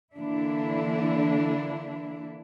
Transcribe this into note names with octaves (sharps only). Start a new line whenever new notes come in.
D3 E3 A#3 D4 E4